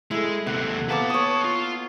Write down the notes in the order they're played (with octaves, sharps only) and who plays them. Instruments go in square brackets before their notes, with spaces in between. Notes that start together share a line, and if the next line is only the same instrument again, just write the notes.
[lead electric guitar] G#3 [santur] E4 A4
[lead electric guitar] D#2 C3 [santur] F#5
[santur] A#3 B3 D5 [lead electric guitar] B4 A5
[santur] C#5 D#6
[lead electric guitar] F4